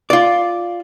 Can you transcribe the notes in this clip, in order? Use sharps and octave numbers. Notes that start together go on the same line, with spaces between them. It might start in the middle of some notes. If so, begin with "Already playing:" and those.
F4 D5